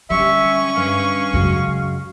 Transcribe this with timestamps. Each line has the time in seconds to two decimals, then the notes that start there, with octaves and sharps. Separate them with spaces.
0.10 D3 G3 C#4 E5 C#6
0.76 G2 F5
1.33 F#2 C#3 G#3 F#4